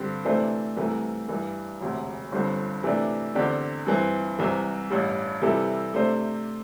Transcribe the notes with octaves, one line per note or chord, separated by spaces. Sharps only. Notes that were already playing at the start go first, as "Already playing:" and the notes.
Already playing: G2 D3 C4 G4
C3 E3 A3 D4 C5
C2 C3 E3 A3
G2 E3 G3
E1 D2 C3
G1 G2 D3 C4
C3 E3 A3 D4 G4
E2 D3 C4 G4 D5
G2 E3 C4
C2 C3 E3
A1 G2 G3
C3 E3 G3 E4 A4
C3 A3 D4 C5